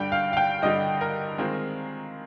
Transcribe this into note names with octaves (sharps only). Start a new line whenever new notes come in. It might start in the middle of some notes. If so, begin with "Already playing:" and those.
Already playing: G2 D3 G3 G5
F5
F5
G5
G2 D3 G3 D#5
A#4
D#3 G#3 C4 F4